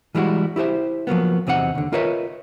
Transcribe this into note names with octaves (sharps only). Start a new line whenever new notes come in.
E3 G3 G#3 E4 F#4
E4 G4 A4 C5 E5
F3 F#3 A#3 B3
E2 C3 C4 D#4 F#4 F#5
D#2 D3
F4 A#4 B4 C#5 D#5 E5